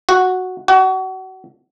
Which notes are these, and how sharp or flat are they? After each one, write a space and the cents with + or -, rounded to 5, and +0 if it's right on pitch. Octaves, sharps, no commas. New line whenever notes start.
F#4 -5
F#4 +30